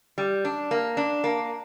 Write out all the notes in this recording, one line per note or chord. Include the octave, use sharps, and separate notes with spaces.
G3
D4
A#3
D4
A#3